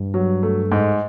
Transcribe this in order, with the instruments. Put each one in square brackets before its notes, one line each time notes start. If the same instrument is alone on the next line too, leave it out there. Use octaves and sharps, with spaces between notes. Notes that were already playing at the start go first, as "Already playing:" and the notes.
Already playing: [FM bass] G2
[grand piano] F#3
A3
G#2